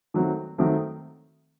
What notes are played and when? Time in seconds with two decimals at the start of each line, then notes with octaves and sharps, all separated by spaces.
0.14 D#3 F#3 A3 C4
0.58 D#3 F#3 A3 C4